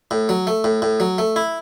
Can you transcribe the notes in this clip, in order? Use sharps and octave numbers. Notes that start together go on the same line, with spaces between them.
A2
F#3
A3
A2
A2
F#3
A3
E4